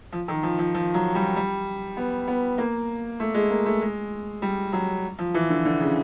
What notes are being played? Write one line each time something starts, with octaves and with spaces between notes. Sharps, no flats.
F3
D#3
F3
F3
F3
F#3
G3
G3
B3
B3
A#3
A3
G#3
A#3
A3
G#3
G3
F#3
F3
E3
D3
D3
C#3